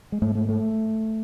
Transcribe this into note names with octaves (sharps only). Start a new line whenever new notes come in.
G#3
G#2 A3
A3
A3